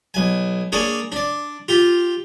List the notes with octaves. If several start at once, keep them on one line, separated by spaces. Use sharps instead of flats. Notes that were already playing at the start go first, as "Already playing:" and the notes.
B1 G#5
A#3 D4 G#4 C#5 D5
D4 D5
F4 G4